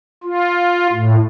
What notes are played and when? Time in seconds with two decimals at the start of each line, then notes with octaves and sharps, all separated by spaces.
0.23 F4
0.93 A2